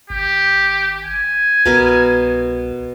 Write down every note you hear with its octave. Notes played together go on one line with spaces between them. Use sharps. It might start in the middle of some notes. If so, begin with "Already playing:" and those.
G#1 G4
G#5
C2 B2 A#4 B5